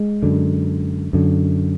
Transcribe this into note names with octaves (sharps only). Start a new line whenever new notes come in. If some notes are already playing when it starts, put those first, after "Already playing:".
Already playing: G#3
F#2 D3
F#2 D3